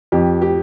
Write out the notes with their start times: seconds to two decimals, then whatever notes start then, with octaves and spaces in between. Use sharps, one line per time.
0.12 F2 G4
0.42 G4